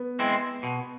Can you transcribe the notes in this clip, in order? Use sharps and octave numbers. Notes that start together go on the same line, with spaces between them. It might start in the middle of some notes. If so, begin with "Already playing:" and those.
Already playing: B3
G#3 C4 E4
B2